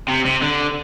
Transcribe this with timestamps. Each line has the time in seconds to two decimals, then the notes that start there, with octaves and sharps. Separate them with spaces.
0.08 C3
0.25 C3
0.42 D3